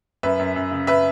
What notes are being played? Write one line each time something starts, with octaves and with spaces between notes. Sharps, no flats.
F#2 B4 E5
F#2
F#2
C#3
B4 E5